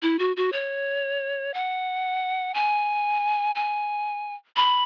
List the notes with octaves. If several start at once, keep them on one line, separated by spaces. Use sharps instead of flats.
E4
F#4
F#4
C#5
F#5
G#5
G#5
B5